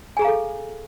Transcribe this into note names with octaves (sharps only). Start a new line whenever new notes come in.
G#4 A4 F5 G#5 A#5